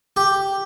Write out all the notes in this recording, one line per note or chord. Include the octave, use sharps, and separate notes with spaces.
G4